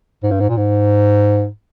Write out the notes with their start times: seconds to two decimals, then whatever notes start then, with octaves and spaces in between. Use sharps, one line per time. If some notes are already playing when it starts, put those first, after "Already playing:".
0.24 G#2
0.31 G2
0.40 G#2
0.49 A#2
0.57 G#2